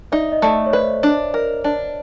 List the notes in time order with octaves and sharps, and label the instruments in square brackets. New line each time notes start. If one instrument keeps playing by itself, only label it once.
[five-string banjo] D#4 [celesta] D5 E5
[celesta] D#5
[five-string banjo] A3 [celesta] D5 E5
[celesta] C#5
[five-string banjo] B4 [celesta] C5 D5
[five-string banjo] D4
A#4
D4